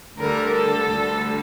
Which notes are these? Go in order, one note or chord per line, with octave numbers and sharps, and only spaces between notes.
D2 D3 G3 A#4
A4
D2 D3 G3